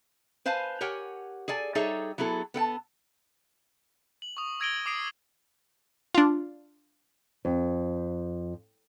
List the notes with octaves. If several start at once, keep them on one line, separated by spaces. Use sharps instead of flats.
B4 C5 F5 G#5 A5
G4 A#4 C#5 F#5 G#5
G#4 A4 D5 G#5
G3 D#4 G#4 A4 C#5 E5
F#3 B3 E4 G#4 A4
B3 A4 G5 A5
F#7
C#6 D#6
E6 G#6 A#6 D7 D#7 G7
D6 D#6 C7 D7 D#7
D4 F4
F2